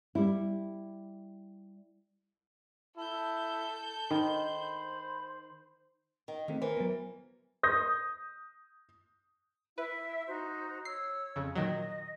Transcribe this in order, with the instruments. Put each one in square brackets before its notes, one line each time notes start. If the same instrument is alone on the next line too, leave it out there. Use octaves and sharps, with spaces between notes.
[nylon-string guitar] G3 E4
[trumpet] E4 [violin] A4 G6 [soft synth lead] A5
[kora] D#3 [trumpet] C5 [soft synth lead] B5
[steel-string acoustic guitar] D#3
[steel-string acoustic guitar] D#2 [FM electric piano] D#3 A3 C4
[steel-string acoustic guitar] E3 [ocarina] A#4 [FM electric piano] C5
[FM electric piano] F#3 B3
[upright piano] D#6 G6 A#6
[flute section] E4 E5 [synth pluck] B4
[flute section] D#4 F#4 C5
[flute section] C#5 E6 [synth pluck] C7
[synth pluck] F2 C#3
[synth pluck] A#2 D#3 F#3 [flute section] D#5